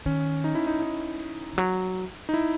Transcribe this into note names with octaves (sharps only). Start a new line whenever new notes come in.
D#3 C#4
D#4
E4
D#4
D#4
E3
F#3
D#4
E4